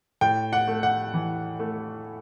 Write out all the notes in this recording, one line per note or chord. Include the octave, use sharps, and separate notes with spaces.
A2 G5
F#5
A3
F#5
E3
A3